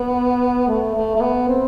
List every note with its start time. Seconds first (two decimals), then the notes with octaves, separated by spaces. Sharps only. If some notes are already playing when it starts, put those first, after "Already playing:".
Already playing: B3
0.68 A3
0.94 A3
1.16 A3
1.21 B3
1.48 C4